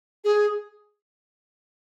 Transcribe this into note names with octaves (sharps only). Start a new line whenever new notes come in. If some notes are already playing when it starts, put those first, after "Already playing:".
G#4